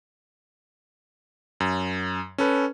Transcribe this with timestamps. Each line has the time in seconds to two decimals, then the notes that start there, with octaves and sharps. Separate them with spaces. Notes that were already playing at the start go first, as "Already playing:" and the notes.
1.60 F#2
2.38 C#4 A4 B4